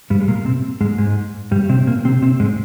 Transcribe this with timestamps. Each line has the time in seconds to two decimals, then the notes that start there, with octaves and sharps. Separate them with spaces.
0.10 G2 G3
0.21 G#3
0.28 A#2 A#3
0.45 C3 C4
0.81 G#2 G#3
0.98 G#2 G#3
1.51 G2 G3
1.69 C3 C4
1.87 A#2 A#3
2.05 C3 C4
2.22 C3 C4
2.40 G#2 G#3